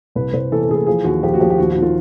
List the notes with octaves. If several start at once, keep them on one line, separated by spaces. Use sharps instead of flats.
C2 B4
C2 C5
E3 A4
A4
E3 G#4
A4
F3 G#4
D#2 F#4
F3 G4
F#4
F3 G4
G4
D#2 F#4
F#4
D#3
F4